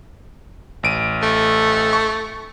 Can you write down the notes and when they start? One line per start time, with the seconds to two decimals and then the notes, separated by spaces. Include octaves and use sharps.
0.83 A1 D7 D#7
1.23 A3
1.93 C#6